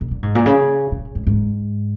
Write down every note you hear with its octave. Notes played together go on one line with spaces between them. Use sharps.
A#2
A#2
G#2
A#2
C#3
A#2
G#2
G#2